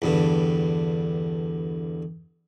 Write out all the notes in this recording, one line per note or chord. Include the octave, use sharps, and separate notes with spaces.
E2 G2 D3